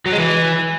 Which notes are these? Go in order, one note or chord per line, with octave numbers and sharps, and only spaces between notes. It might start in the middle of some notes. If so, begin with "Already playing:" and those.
F#3
G#3
E3